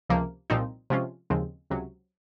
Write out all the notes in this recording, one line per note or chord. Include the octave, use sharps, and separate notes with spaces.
C#2 C3 F3 A#3
C2 A#2 F3 C4 D#4
C3 F3 G#3 C#4 F4
D#2 C#3 F3 G#3 C4
C#2 C3 F#3